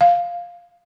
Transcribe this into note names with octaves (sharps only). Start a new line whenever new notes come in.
F5